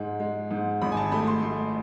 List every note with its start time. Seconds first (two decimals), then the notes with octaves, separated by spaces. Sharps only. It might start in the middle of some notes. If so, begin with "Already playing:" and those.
Already playing: G#2 G#3
0.20 G#3
0.51 G#2
0.82 G#1 B5
0.92 G#5
0.97 A5
1.12 A3 B5
1.27 C6
1.42 A3